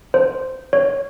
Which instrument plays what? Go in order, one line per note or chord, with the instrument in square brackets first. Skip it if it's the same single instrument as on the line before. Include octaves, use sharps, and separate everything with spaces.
[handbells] C5
C#5